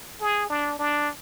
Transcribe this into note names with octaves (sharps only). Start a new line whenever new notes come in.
G#4
D4
D4